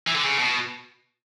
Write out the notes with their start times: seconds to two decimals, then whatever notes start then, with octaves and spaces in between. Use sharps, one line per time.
0.07 E3
0.15 D3
0.23 C#3
0.39 B2